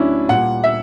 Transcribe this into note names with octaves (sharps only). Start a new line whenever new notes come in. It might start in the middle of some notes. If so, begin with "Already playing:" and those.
Already playing: D2 D3 F#3 C#4 D4 E4
A#2 G3 F#5
E5